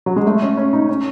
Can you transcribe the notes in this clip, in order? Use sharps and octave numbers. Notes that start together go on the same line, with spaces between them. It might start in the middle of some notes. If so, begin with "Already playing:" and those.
F#3
G#3
A3
C#4
C#4
D#4
C#4